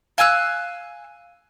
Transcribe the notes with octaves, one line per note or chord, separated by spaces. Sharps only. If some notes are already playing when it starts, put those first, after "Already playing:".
F5 G#5 E6 F#6